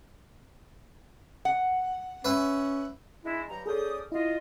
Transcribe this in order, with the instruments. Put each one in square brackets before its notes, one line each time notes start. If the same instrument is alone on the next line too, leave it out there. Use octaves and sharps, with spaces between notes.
[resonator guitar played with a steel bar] F#5
[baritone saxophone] C#4 [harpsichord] B4 E5
[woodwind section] G#3 D4 E4
G2 F#3 A#5
[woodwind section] C#4 D5 D#6 [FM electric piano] G#4 A4 G6
[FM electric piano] E4 [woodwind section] F4 D#5